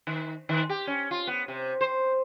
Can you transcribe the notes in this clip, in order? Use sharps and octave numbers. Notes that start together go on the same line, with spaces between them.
D#3
D#3
G4
C#4
F4
B3
C3
C5